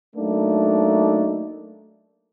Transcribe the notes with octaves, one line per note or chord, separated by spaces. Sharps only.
F#3 A3 A#3 D4 D#4